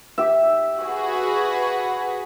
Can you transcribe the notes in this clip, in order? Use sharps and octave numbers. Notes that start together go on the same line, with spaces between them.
G4 E5
F#4 G#4 B4